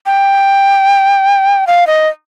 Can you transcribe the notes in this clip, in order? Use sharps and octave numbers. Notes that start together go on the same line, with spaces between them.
G5
F5
D#5